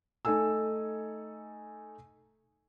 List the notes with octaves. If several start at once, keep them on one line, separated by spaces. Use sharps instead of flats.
A3 D#4 A4 G#5 E6